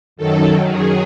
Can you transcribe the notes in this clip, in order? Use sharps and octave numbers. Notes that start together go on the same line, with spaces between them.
F#2 D#3 F#3 A4
G#4